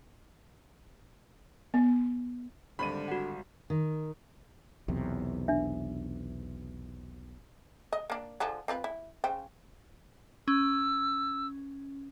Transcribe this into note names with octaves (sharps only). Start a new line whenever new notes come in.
B3
G#1 D3 G3 B5 D#7
F#4 F#5
D#3
B1 E2 C3
D4 E5
D#5
A#3 D4
D3 F3 G#4
C4 F4 B4
E4
C#3 C5 G5
C#4 E6